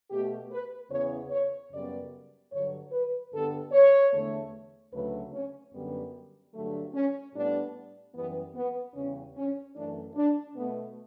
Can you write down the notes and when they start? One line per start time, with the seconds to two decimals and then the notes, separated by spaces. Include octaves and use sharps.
0.10 B2 A3 G4
0.51 B4
0.91 E2 C#3 E3 B3 C#5
1.31 C#5
1.72 F#2 C#3 G3 B3 D5
2.52 G2 D3 F#3 C#5
2.92 B4
3.33 G2 D3 G3 B3 A4
3.72 C#5
4.12 E2 D3 A3
4.93 D2 C#3 F#3 A3 B4
5.33 C#4
5.74 F#2 D3 G3 B3
6.54 G2 D3 F#3 A3
6.94 C#4
7.34 A2 G3 B3 D4
8.15 F#2 E3 G3 B3
8.55 B3
8.95 E2 C#3 G3 C#4
9.36 C#4
9.76 F#2 E3 A3 D4
10.16 D4
10.56 B2 A3 B3